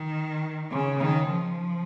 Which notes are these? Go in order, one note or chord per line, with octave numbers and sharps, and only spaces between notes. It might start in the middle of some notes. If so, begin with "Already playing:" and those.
Already playing: D#3
C#3
D#3
F3